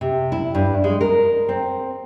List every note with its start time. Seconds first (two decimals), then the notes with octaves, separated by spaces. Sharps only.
0.01 C3
0.32 E4
0.55 G2
0.84 G#3
1.01 A#4
1.49 C4